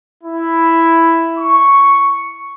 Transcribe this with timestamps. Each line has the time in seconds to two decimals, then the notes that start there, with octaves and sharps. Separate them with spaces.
0.24 E4
1.37 C#6